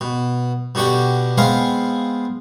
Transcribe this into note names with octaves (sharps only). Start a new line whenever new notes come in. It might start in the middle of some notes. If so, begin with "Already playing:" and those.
B2
B2 D3 F#4 G4 G5
G#3 B3 C4 G#4 F5